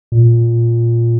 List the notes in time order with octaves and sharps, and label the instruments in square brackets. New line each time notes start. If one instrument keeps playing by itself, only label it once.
[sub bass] A#2